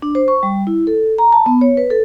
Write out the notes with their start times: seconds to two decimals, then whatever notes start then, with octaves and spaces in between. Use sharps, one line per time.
0.02 D4
0.15 C5
0.28 C#6
0.43 G3
0.67 E4
0.87 A4
1.18 A#5
1.32 A5
1.46 B3
1.61 C#5
1.77 B4
1.90 A4